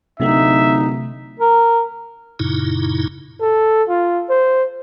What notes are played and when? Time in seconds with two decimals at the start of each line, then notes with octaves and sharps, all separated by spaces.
0.20 D1 C3 A3 D#4 E5
1.39 A#4
2.39 F#2 A#2 C#3 D#4 E4
3.41 A4
3.89 F4
4.29 C5